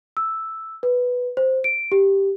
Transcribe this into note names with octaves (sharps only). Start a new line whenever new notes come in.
E6
B4
C5
D7
G4